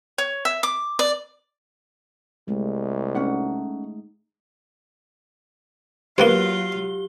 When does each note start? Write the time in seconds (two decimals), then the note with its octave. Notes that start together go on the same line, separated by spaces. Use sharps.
0.18 C#5
0.45 E5
0.63 D6
0.99 D5
2.48 C2 G#3 A3
3.15 A3 C#4 D#4 F#5
6.18 F#3 A#3 B3 F4 G4 C5 F5 G7